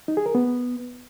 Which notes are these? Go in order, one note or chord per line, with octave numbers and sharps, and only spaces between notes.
D#4
G#4
A#4
B3